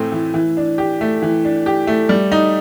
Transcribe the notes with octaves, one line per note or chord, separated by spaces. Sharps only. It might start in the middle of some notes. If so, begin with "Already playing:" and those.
Already playing: A2 E3 A3 C4
E3
E3
D4
G4
A3
E3
D4
G4
A3
G3
D#4